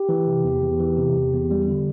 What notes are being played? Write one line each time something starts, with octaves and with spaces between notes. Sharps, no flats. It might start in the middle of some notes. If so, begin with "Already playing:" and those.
Already playing: G4
E3
C3
E2
E2
E3
C3
E2
E2
G3
D3